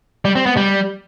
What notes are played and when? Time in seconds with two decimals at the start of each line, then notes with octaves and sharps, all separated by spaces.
0.25 G3
0.35 C4
0.46 B3
0.57 G3